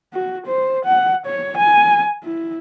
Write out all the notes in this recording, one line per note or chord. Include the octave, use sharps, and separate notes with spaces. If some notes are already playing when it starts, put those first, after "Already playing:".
F#4
C5
F#5
C#5
G#5
E4